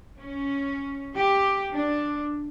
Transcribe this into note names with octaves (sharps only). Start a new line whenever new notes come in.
C#4
G4
D4